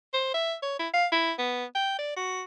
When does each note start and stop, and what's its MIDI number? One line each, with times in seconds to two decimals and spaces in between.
0.14 0.30 72
0.34 0.55 76
0.62 0.76 73
0.79 0.88 64
0.94 1.07 77
1.12 1.32 64
1.39 1.65 59
1.75 1.96 79
1.99 2.11 74
2.16 2.43 66